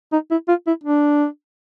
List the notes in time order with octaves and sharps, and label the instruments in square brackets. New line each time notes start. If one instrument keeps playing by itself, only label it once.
[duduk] D#4
E4
F4
E4
D4